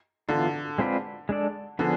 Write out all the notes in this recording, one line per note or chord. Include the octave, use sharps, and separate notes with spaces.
D3 E3 B3 F4
G#3 C4 F4 B4 D5
G#3 D4 A4 D5
D3 F3 B3 D4 G#4